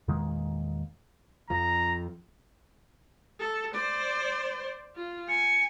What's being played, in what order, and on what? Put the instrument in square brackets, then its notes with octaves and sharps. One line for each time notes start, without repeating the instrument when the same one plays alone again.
[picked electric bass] E2 A#2 D#3 G#3
[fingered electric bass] F2 F3 [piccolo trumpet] A#5
[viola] A4
C5 D5
F4
[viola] G#5 [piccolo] C#7